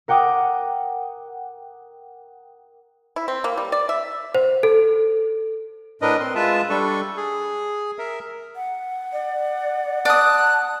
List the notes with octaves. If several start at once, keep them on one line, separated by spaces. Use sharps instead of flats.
A#4 F#5 G5 D6 D#6
E4
C4
A#3
G3
D5
E5
C5
A4
A2 D4 A#4 B4 D#5
C4 C6
G#3 F4 B4 E5 A5
G3 D4 A4 C#6
G#4
A#4 E5
F#5
D5
D5 A5 D#6 F#6